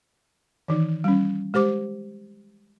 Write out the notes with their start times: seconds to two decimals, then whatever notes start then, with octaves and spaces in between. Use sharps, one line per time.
0.68 D#3 E3 D#4
1.04 G3 C#4
1.54 G#3 G4 C5 D6